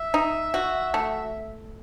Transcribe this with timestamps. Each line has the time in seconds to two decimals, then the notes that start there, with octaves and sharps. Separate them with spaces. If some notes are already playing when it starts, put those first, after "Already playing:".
Already playing: E5
0.14 D#4
0.54 F#4
0.94 A3